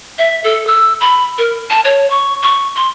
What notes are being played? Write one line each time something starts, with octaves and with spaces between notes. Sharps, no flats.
E5
A4
E6
B5
A#4
A5
C#5
C#6
C#6
C6